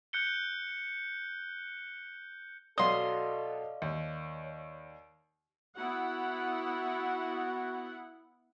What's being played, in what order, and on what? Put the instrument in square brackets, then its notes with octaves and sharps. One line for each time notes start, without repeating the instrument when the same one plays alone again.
[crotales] F#6 G6 C#7 G7
[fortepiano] B2 F#3 D#6 [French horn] A4 [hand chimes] D5 F5 [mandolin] D#5 C6
[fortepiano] D#2 [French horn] C#5
[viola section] B3 E4 F#5 [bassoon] F#4